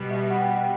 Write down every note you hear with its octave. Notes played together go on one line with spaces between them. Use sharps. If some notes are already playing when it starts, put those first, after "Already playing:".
Already playing: B2 G3 B3
E5
F#5
G5
F#5